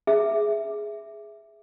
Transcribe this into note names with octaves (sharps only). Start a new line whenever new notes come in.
G#4 E5